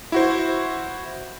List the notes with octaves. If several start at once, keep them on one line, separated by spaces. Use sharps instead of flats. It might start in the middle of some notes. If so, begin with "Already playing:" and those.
E4 F#4 C5